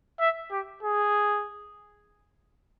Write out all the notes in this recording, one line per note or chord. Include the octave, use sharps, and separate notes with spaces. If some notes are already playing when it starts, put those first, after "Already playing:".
E5
G4
G#4